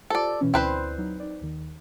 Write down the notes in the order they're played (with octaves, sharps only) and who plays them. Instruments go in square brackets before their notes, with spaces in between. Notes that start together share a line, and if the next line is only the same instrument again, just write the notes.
[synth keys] F4 G4 C5 [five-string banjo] A4 D5
[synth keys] B2 E3 C#4
[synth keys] D2 E4 D5 [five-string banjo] C4 B4 C5
[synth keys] F#3 D#4
D#4 D5
D#2 D#3